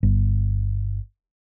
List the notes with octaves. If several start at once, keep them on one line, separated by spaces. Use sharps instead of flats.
G1